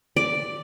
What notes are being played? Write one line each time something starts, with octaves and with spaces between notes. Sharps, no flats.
D5